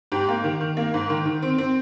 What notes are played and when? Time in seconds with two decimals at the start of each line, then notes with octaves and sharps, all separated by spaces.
0.12 G#2 G4
0.29 A#3
0.44 D#3
0.61 D#3
0.77 A#3
0.94 G#2
1.10 D#3
1.26 D#3
1.42 C4
1.58 C4